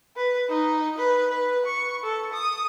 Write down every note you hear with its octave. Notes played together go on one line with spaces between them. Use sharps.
B4
D#4
B4
B4
C#6
A4
D#6